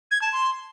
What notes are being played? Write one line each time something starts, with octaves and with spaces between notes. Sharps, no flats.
G#6
A5
C6